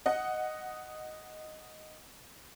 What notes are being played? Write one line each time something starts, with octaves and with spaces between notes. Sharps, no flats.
D#5 F#5